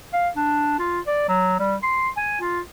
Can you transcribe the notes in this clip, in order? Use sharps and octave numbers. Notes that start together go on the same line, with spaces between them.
F5
D4
F4
D5
F#3
G3
C6
G#5
F4